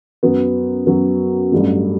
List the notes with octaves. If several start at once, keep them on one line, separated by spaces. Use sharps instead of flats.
F#2 F#3 B3
F#2 F#3 B3
A1 G2 F#3 A3